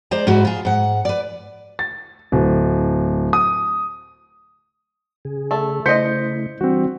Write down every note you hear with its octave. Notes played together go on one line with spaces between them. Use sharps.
G#3 C5 D5 A#5
G#2 G#3 E4 F#4
F4 G#4
G#2 F#5
B4 D5
A6
D1
D#6
C#3 G#4
A3
C#3 A3 E4 C5 D#5 G6 B6 C#7
E3 G3 C4 D4 F#4